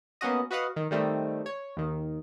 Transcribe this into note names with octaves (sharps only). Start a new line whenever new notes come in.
A#3 B3 C#4 F#4 D#5
F#4 B4 D#5 F5 F#5
D#3
D#3 G3 A3 C4
C#5
D#2 D#3